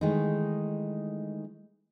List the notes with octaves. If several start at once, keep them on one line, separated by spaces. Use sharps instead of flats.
D#3 E3 G#3 A3 D#4